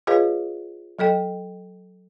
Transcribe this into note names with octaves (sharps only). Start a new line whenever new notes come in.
F4 G#4 B4 C#5 D#5 F5
F#3 A4 D#5 G5